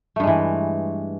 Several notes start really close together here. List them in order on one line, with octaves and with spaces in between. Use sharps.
A3 G2 G#3 E3